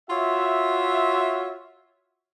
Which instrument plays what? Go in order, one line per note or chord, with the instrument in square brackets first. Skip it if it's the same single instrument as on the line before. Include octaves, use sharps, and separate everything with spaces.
[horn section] F4 F#4 C#5 E5